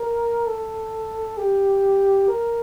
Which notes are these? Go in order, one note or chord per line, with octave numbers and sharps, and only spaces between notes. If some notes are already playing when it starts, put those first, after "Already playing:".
Already playing: A#4
A4
G4
A#4